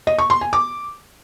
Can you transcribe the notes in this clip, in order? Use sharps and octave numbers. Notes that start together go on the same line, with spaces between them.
D#5
C#6
C6
G#5
D6